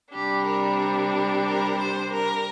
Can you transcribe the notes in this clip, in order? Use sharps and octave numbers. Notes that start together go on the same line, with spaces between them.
C3 G3 D4 G4
A#4
A#4
A#4
C5
A#4